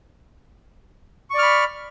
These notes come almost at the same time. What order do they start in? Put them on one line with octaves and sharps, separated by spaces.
C#6 D5 F6 B5